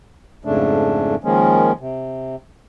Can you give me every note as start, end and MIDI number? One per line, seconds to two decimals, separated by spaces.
0.45 1.15 41
0.45 1.15 44
0.45 1.15 49
0.45 1.15 57
0.45 1.15 62
1.24 1.72 51
1.24 1.72 53
1.24 1.72 56
1.24 1.72 58
1.24 1.72 61
1.80 2.36 48